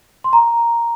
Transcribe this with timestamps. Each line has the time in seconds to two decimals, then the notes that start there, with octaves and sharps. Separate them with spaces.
0.24 C6
0.33 A#5